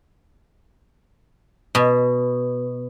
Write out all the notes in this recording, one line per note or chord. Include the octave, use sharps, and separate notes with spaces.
B2